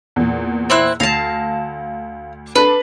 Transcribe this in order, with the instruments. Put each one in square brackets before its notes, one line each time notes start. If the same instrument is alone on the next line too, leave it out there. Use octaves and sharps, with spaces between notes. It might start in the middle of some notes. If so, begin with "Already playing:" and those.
[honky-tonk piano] E2 A#2
[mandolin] C4 E4 F#6
[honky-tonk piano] D2 A#6 [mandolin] F5 A5
[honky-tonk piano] D4 A4 [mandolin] B4